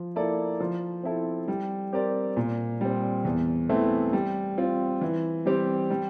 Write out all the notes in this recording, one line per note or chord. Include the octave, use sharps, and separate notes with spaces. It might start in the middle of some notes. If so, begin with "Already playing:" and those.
Already playing: F3
A#3 E4 A4 D5
F3
C4 E4 A4
G3
C4 G4 A#4 D5
A#2
G3 C4
E2
E3 A3 C4
G3
C4 F4
E3
G3 C4 G4
G3